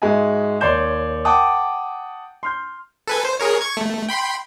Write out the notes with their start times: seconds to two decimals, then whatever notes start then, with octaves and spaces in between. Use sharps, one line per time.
0.02 G#2 G#3 F#4 E5 G#5
0.61 D#2 C#5 D5 C6 G6 E7
1.25 F#5 G5 A5 D6 D#6
2.43 C6 F6 G6
3.08 A4 B4 G#5
3.25 C5
3.39 G#4 A#4 C#5
3.61 C#6 G#6
3.77 A3
4.09 G5 B5 C6